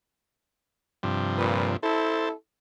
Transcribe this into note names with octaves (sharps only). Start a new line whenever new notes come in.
G2 C3 F3
A#2 B4
E4 A4 C5 A5